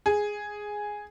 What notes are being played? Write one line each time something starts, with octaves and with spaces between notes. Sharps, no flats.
G#4